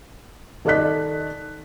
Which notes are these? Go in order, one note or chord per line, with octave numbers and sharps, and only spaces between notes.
D#3 A4 D5 D#5 F#6 B6